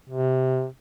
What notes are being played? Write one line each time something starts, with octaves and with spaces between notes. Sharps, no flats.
C3